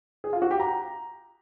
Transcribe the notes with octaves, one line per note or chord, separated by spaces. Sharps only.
G#4
F4
F#4
G4
A#5